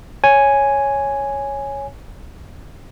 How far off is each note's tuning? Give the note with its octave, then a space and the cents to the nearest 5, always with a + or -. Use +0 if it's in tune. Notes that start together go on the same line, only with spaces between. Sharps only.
C#5 +0 G#5 +0